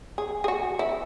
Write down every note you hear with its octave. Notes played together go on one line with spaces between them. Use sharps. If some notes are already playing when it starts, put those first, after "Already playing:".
G#4
G#4
F#4
E4